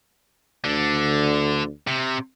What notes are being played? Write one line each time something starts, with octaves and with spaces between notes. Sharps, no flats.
D2 D3
C3